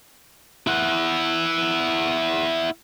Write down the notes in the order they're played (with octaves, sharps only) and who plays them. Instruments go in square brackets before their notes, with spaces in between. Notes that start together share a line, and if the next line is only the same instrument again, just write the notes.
[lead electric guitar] E4 F#5